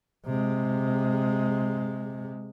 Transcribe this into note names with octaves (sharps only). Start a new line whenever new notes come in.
C3 G#3